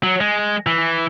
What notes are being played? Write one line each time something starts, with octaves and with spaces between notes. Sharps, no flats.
F#3
G#3
E3